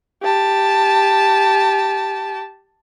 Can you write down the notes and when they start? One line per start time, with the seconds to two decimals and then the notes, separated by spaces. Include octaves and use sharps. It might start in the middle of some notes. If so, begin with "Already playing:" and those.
0.23 G4 A5